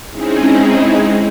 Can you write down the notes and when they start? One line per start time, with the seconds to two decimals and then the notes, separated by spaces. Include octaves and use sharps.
0.10 G#3 C4 C#4 D#4 E4 G#4